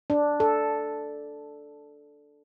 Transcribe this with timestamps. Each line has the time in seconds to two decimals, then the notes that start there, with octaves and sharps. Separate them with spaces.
0.10 D4
0.40 A4